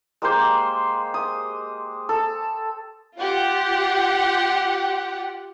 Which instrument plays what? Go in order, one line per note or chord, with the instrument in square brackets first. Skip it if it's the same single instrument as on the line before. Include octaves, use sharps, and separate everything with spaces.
[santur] G#3 A#3 G4 C5
D#6
A4
[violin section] F4 G4 F#5